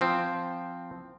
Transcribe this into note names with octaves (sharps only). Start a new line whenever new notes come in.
F3 C4